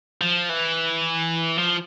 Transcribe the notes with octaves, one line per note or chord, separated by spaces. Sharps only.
F3
E3
F3